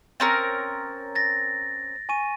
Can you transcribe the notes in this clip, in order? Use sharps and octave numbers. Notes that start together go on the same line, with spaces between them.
C4 C#4 A#4 A6
A6 A#6
G#5 C#6 D#7